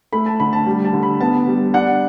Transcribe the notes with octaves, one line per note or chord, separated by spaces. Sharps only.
A3 B5
A5
D3 B5
A5
G3
A5
D3
B5
B3 A5
G3
D4 F#5